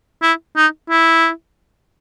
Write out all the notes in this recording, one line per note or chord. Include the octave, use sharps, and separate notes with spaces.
E4
D#4
E4